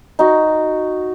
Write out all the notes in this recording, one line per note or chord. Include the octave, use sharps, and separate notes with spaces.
D#4 F#4